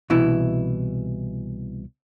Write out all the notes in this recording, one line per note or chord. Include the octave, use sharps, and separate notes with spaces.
C2 B2 E3 E4